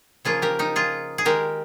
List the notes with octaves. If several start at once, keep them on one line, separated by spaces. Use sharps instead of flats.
C#3 F3 A#3 F4 G#4
G4 A#4
D#4 G4
F4 G#4
G#4
D#3 G#3 G4 A#4